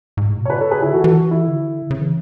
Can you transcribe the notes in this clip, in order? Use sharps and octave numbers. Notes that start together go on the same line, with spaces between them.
G#2
A2
B2
C#5
C#3 B4 D5
A4 C#5
G#4 B4
D3 E4 G#4
E3 F#4 A4
E3 F#4 A4
E4
D3
C#3
E3